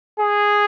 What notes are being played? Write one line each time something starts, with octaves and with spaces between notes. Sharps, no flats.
G#4